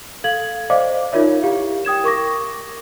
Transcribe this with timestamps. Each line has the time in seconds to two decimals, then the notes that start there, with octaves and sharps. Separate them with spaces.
0.24 A4 F5 G#6 F#7
0.70 C5 D5 D#5 F5 D6
1.13 D#4 F4 A#4 C#5 E5
1.43 E4 G4 F5
1.85 G5 D#6 G#6 E7
2.04 A#4 C#6 D6 A#6